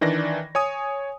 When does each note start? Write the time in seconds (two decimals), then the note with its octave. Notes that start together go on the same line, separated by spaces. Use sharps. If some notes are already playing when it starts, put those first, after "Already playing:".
0.01 D#3 E3 D4 D5 A#6
0.55 C#5 G#5 D#6